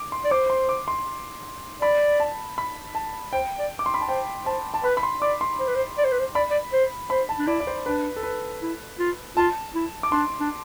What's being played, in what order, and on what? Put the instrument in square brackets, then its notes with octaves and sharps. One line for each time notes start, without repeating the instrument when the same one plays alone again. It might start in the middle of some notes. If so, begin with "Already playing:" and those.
Already playing: [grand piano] D6
C6
[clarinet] D5
[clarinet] C5 [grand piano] D6
[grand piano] C6
D6
C6
[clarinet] D5 [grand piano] B5
[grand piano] A5
B5
A5
[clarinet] C5 [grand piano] G5
[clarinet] D5
[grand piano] D6
C6
B5
A5
[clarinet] C5 [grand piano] G5
[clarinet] C5 [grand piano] A5
[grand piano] A5
[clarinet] B4 [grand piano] B5
[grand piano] B5
C6
[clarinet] D5 [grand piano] D6
[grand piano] C6
[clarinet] C5
B4
C5
D5
C5
B4
C5
[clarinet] D5 [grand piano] B5
[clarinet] D5
C5
[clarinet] C5 [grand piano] B5
[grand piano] A5
[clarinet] D4
[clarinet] E4 [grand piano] D5
[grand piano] D5
C5
[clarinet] D4 [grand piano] B4
[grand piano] A4
B4
[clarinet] E4
F4
[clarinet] F4 [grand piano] A5
[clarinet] E4
[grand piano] D6
[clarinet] D4 [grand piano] C6
[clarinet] D4